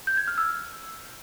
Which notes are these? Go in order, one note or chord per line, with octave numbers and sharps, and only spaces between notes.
G6
G#6
F6
E6